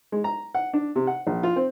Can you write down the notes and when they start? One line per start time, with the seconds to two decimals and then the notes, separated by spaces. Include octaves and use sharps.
0.12 G#3
0.24 A#5
0.55 F#5
0.73 D4
0.96 C3
1.07 F#5
1.27 A#1
1.43 F4
1.56 C4